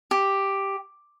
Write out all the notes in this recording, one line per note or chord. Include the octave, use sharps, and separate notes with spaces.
G4